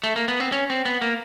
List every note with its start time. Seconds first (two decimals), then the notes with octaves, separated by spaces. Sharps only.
0.04 A3
0.16 A#3
0.28 B3
0.40 C4
0.52 C#4
0.70 C4
0.85 B3
1.02 A#3